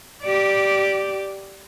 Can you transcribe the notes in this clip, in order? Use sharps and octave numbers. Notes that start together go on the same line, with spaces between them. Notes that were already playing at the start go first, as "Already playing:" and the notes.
G4 D5